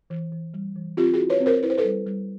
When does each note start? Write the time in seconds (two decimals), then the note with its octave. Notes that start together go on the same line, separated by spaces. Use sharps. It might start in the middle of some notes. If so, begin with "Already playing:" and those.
0.10 E3
0.32 E3
0.54 G3
0.76 E3
0.97 C4 F4 G4
1.13 F#4 G#4
1.20 E4
1.30 B4 C#5
1.40 C4
1.46 A#4 C5
1.63 E4 B4
1.70 C5
1.78 A4 B4
1.85 G3
2.06 G3